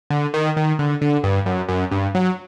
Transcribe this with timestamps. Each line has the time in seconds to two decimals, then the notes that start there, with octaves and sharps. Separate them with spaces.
0.10 D3
0.34 D#3
0.57 D#3
0.79 D3
1.01 D3
1.24 G2
1.46 F#2
1.69 F#2
1.91 G2
2.15 F#3